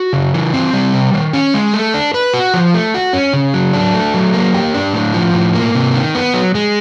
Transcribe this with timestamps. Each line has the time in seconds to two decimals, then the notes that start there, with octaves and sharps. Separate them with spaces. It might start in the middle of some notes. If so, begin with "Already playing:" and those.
Already playing: F#4
0.13 C#3
0.34 E3
0.54 C4
0.73 G3
0.94 C3
1.14 D#3
1.33 C#4
1.54 G#3
1.73 A3
1.94 D4
2.14 B4
2.34 F#4
2.54 F3
2.74 A3
2.94 F#4
3.13 C#4
3.33 C#3
3.54 F#3
3.73 D4
3.94 A3
4.14 F#3
4.33 A#3
4.54 G4
4.74 D4
4.94 A2
5.14 F3
5.34 A2
5.55 A#3
5.75 C3
5.94 D#3
6.15 B3
6.34 F#3
6.55 G#3